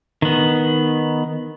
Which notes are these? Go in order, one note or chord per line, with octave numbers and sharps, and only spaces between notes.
D#3 B3